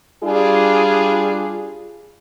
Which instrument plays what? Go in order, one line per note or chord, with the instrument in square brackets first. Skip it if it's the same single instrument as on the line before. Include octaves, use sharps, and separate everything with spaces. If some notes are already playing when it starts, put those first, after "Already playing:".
[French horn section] G3 D4 F4 G#4